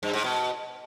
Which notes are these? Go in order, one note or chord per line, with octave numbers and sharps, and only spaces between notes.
G2
G#2
B2